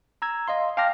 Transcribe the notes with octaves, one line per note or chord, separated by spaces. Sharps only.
A#5 E6 G#6
D#5 F5 C6
F5 G5 A5 D6 F6 A#6